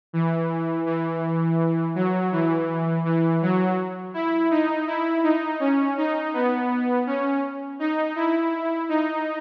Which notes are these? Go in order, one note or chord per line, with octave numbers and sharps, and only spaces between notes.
E3
E3
F#3
E3
E3
F#3
E4
D#4
E4
D#4
C#4
D#4
B3
C#4
D#4
E4
D#4